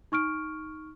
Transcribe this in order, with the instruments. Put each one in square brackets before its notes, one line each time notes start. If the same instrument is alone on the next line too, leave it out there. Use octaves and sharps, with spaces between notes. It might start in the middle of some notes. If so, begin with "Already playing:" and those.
[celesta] D#4 C#6 F6 D7